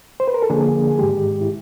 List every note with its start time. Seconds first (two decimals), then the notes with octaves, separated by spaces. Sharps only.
0.20 C5
0.28 B4
0.34 A#4
0.42 A4
0.50 D3 F3 A#3 D4 G#4
0.90 G#4
0.98 G#2 D#3 G#3 G4
1.41 E4